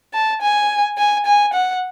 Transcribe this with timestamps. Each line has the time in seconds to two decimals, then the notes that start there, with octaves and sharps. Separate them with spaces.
0.14 A5
0.42 G#5
0.98 G#5
1.26 G#5
1.54 F#5